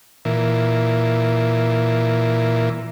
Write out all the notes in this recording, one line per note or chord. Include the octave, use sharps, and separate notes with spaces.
A#2 E3